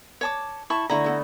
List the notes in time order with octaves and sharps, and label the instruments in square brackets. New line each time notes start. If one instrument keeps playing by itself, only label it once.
[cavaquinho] C#5 A5 D6
E4 A5 C#6
[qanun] D3 A3 [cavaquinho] E4 A#5
[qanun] B3 A4